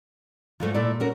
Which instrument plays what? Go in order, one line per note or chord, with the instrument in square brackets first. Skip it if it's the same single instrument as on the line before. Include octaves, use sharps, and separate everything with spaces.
[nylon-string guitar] G#2 F4 [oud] F3 F#3 A3
[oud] A#2 [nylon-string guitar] A3 E4 D5
[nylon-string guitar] C#4 F#4 A#4